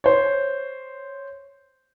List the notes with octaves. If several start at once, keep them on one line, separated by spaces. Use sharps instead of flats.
C5 C#5